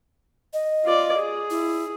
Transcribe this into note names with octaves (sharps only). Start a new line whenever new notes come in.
D#5
F4 D5
G#4
E4